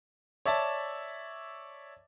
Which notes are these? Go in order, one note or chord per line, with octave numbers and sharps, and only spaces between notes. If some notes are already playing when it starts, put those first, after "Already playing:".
C#5 D5 E5 A5